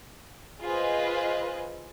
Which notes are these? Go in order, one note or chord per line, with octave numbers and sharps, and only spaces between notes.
F4 G#4 B4 C5 D#5